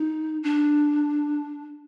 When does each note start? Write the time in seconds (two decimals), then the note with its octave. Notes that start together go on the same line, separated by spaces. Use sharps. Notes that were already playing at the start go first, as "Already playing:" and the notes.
Already playing: D#4
0.43 D4